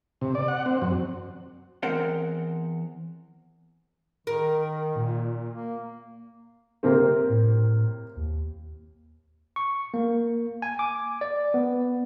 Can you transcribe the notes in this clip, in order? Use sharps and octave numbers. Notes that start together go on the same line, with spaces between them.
C3
D5
F#5
C4
F#2
E2 C4 A#4 C5 F#5 G5
D#3 A#4
A#2
A#3
C3 A#3 C4
A2
D#2
C#6
A#3
G#5
D6
D5
B3